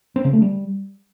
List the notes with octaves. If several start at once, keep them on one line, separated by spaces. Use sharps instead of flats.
C4
C#3
A3
G3